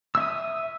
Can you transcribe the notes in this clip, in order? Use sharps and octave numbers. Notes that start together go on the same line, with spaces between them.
E5 D#6 E6